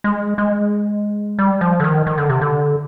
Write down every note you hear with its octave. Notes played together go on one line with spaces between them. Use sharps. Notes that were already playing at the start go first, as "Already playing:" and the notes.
G#3
G#3
G3
F3
D3
D#3
D#3
D3
C3
D3